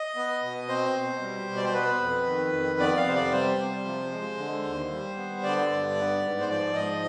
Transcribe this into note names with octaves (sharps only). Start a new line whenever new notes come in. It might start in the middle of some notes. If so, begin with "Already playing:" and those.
Already playing: D#5
B3
B2
C4 C5
B2
G3
B2
D5
C5
B3 B4
F2
D#3
F2
B3 D5
F5
C3 C5
D5
G3 C5
C3
F3
G#3
D3
D#2
G3
B3
D3 D5
G2
B3
G#2
C5
F3 D5
G#2 D#5